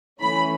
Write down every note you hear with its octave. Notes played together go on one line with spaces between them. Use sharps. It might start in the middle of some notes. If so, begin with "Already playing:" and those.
E3 A3 C#4 B5